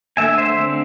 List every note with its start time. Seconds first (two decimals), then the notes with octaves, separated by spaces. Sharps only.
0.17 D3 A3 C4 E5 G#5
0.38 C5 E5
0.59 D3 A3 C4